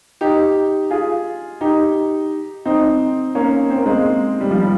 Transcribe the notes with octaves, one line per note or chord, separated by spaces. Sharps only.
D#4 G4
F4 G#4
D#4 G4
C4 D#4
A#3 C#4
C4
A#3
G#3 C4
G3
F3
G3